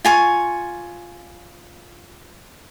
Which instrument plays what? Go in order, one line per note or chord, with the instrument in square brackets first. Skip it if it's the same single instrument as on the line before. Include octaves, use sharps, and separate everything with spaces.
[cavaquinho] F4 G#5 C#6